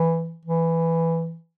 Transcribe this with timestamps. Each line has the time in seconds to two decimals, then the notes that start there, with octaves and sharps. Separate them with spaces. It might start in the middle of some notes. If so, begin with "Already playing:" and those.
Already playing: E3
0.45 E3